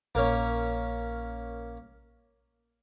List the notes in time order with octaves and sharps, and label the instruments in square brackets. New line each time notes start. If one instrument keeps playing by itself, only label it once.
[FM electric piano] A#1 A#4 F6 [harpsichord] A#3 C#4